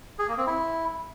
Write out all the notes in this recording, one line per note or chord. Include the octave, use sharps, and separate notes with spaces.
G#4
A#3
C4
E4